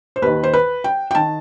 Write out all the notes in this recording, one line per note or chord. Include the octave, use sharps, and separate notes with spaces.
C5
D#2 D#3 B4
C5
B4
G5
G5
D#3 A5